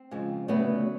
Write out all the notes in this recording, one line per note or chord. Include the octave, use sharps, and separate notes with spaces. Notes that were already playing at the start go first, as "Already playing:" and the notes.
Already playing: C4
F2 C#3 F3 G#3
D2 C#3 F#3 A3 B3